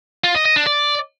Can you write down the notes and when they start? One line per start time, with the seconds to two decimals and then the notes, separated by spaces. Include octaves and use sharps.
0.24 F4
0.35 D#5
0.45 D#5
0.56 D4
0.67 D5